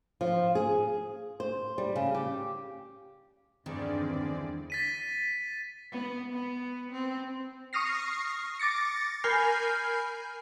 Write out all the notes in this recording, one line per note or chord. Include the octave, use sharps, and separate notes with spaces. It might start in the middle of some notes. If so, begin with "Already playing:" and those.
F3
G#4
C5
G3
C#3
G4
E2 G2 D3 D#3 C4 G#4 D5
A6 B6 D#7
B3
B3
C4
C#6 D#6 F6 A#6 C7
D6 A6 A#6 C#7
A#4 G#5 B5 F6 G6 C7